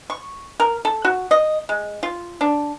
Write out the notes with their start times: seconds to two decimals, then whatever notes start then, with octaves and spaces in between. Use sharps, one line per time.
0.10 C#6
0.60 A#4
0.85 A4
1.05 F#4
1.31 D#5
1.69 G#3
2.03 F4
2.41 D4